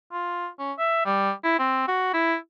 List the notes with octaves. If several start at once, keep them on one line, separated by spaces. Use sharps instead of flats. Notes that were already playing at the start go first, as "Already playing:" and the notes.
F4
C#4
E5
G3
E4
C4
F#4
E4